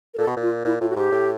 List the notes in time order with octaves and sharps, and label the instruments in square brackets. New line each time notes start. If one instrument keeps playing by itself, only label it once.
[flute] A#4
[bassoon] A#2 [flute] A4
[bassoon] B2
A#2
[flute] F4
[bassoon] A#2 [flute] E4
[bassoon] A2 [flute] F4
[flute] F#4
[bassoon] G#2 [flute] G4
[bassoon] A2